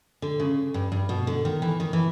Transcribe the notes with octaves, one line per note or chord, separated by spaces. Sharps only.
D3
C#3
G2
G2
B2
D3
D#3
E3
D#3
E3